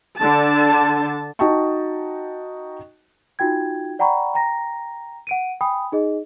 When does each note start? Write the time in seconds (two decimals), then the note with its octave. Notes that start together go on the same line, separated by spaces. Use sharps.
0.17 D3 A5
1.39 D#4 F#4 D#5 G5 A5 C#6
3.39 D#4 F4 F#4 G5 G#6
3.99 D5 F#5 G5 A#5 B5 C#6
4.34 G5 A#5 A#6
5.27 F#5 D7 D#7
5.61 G5 G#5 B5 D#6
5.92 D#4 G#4 D#5